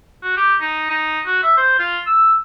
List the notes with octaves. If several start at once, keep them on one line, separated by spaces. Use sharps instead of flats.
F#4
G4
D#4
D#4
F#4
E5
C5
F4
E6